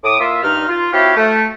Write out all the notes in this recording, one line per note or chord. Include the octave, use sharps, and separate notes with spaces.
A2 D6 D#6
A#3 F4 E5
G2 D#4 F6
F4
C4 E4 F#4 G4 C#5 F5
A3